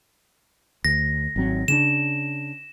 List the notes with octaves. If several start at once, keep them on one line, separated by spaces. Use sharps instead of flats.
D2 A#6
G#1 F#3 C4
C#3 C#4 D4 E7